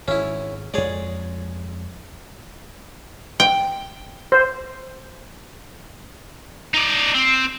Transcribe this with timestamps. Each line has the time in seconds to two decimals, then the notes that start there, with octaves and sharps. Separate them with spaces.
0.08 G#1 C#4 E4
0.74 F2 G#3 G#4 C#5 D5
3.40 G5
4.32 C5
6.74 D#4 D5
7.14 C4